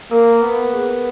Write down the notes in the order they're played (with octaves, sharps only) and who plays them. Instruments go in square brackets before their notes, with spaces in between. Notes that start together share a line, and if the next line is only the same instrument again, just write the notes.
[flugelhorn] A#3 [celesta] A#4
[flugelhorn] B3
[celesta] G#4